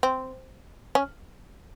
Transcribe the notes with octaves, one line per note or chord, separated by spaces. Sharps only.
C4
C#4